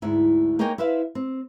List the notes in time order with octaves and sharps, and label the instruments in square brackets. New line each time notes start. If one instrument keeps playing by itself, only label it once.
[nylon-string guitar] D2 G#2 E4
A#3 D#4 A#4 C#5 G5 G#5
E4 B4 C5 E5 F5
C4